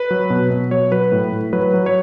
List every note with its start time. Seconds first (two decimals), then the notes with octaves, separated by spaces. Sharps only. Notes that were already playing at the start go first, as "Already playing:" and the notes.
Already playing: B4
0.11 F#3
0.30 B2
0.50 B2
0.71 F#3 C#5
0.92 F#3 B4
1.12 A2
1.32 A2
1.53 F#3 B4
1.74 F#3
1.86 C#5